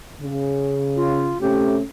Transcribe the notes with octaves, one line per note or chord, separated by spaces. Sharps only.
C#3
F4
C3 A3 C#4 G4